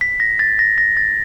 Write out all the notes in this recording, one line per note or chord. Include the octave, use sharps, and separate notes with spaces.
B6
A#6
A6
A#6
A#6
A6